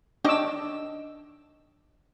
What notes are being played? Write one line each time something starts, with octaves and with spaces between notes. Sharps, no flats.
D#3 D4 C#5 D#5 D6 E6